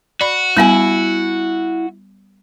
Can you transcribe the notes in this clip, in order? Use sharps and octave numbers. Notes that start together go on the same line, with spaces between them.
F#4 D5 B5
G3 B3 E4 G#5